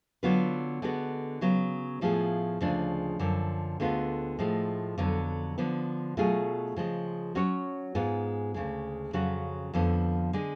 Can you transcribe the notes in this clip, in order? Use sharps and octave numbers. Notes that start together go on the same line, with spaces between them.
D3 F#3 B3 F4 B4
D3 G#3 B3 F#4
C#3 F#3 B3
A2 F3 B3 F4 G#4
D2 C#3 F3 G#3 D4
F#2 D3 F3
D2 D3 G#3 B3 F4
A2 F3 G#3
F2 D3 F#3 B3
D3 F3 B3
B2 F#3 A3 F4 G#4
C#3 F3 G#3
F#3 C#4 F#4 C#5
G#2 G#3 B3 F4
D2 C#3 G#3
F2 C#3 F#3 C#4 F#4
F2 D3 F3 B3
D3 G#3